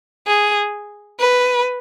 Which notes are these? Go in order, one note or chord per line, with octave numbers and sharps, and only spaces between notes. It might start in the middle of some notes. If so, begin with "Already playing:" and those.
G#4
B4